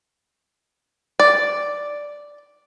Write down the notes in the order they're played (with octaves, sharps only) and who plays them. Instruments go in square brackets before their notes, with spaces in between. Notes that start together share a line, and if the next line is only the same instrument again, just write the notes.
[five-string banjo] D5